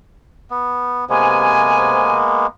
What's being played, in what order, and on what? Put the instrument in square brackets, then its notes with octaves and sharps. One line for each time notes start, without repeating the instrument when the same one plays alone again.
[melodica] B3
[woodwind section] C3 G#5 [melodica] G#3 A#3 B3